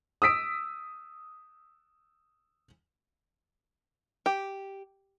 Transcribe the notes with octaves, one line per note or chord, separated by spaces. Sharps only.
D#6 E6 B6 D7
G4